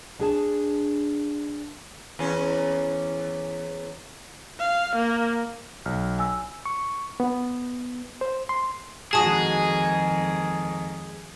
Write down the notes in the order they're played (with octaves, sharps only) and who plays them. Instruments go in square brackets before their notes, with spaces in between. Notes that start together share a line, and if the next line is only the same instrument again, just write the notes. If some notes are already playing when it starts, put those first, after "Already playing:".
[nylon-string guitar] D4 G#4 A5
[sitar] E2 C#4
[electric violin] F5
A#3
[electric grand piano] B1 [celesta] F6
[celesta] G#5 E6
[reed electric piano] C#6
B3
C5
C6
[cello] F2 D#3 [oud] G#3 F#4 [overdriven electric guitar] G#4 [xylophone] A5 D#6